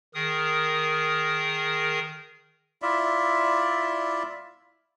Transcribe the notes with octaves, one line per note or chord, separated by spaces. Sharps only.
D#3 G#4 A#4 D#6
E4 F4 D5 E5